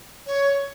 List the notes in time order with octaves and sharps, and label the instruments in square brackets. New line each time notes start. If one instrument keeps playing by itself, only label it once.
[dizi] C#5